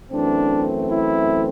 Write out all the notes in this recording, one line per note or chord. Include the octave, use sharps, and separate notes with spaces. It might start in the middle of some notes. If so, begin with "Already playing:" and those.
F#2 E3 A3 C4 D4
E4